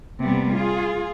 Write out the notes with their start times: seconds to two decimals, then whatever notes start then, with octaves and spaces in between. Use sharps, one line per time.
0.22 C3 G3 A#3 B3
0.54 F4 G#4